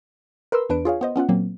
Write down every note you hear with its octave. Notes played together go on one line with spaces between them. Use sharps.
A#4 B4 C6 E6
E2 D4 B4 D7
F4 G#4 C#5 F5
B3 C5 D#5
B3 C#4 F4 F#5
A#2 F#3 A#3 C4